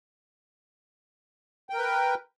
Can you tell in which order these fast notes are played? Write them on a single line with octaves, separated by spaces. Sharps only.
G5 A#4 B4